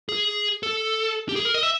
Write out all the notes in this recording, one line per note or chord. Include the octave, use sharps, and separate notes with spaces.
G#4
A4
G4
G#4
A#4
D#5
E5